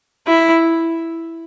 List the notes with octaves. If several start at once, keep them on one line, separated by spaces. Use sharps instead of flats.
E4